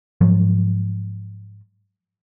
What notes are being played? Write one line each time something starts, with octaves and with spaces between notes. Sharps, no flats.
G#2 F3 F#3